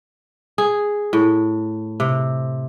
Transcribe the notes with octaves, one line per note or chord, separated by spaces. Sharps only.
G#4
A2
C3